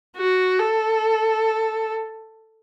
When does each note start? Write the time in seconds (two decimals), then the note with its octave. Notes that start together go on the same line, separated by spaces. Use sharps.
0.17 F#4
0.59 A4